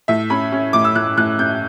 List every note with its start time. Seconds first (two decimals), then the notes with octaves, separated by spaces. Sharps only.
0.08 A2 E5
0.30 C#4 B5
0.52 C#4
0.73 A2 D6
0.84 E6
0.95 A2 F#6
1.17 A2 F#6
1.39 C#4 G6